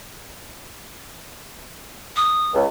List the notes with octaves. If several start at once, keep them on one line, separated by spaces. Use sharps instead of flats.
D#6
C#2